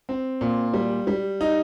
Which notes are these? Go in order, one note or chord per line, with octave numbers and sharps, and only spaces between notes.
C4
A#2
G3
G3
D#4